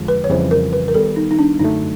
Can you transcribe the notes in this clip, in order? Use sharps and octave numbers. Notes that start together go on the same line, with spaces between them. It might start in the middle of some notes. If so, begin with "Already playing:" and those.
Already playing: F2 D3 F3 G#3
B4
C#5
F2 C#3 E3 G3 C5
A#4
B4
A#4
D#3 G3 B3 A4
D#4
D#4
D4
F#2 D3 F#3 A3 D#4